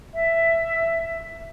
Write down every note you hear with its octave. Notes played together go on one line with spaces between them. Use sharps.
E5